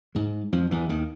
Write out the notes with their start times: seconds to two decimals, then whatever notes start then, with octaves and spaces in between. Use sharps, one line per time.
0.15 G#2 G#3
0.53 F2 F3
0.71 E2 E3
0.89 D#2 D#3